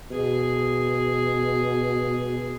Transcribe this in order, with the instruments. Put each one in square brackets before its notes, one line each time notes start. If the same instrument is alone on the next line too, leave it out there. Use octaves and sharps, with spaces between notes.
[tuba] B2 [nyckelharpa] G#4